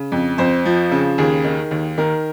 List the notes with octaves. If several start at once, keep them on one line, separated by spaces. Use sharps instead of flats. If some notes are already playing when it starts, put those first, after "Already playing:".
Already playing: C#3
F2
F2 C5
F3
C#3
D#2 G#4
D#3
D#2
D#3 A#4